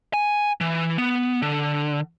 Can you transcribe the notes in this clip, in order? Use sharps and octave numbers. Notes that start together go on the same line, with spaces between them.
G#5
E3
B3
D3